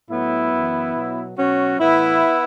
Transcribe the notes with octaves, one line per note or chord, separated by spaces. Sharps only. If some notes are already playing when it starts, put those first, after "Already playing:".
A2 F#3 B3 E4
F#2 E3
B2 F#3
B2 F#3 C#4 F#4
A2 E3 B3 E4